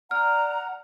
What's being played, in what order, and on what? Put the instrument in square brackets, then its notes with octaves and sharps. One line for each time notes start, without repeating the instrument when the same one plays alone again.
[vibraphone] D5 [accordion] F#5 [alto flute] A#5 [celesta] F6